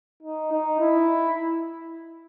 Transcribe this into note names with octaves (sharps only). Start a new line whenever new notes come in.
D#4
D#4
E4